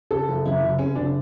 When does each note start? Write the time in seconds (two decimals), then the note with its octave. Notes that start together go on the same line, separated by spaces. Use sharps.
0.11 C#3 A4
0.28 F#1
0.45 F#2 E4
0.63 F#1
0.79 C#3 C#4
0.95 F#1 D4